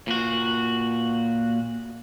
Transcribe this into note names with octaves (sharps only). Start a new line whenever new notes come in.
A#2 F#4